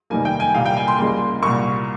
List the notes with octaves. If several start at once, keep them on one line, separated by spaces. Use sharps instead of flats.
F1 D#2 D#3 G3 A#3 G#5
G5
G#5
C2 A#2 G3 A#3 F5
G5
G#5
C6
C#2 C#3 G3 A#3
C2 A#2 G3 A#3 C#6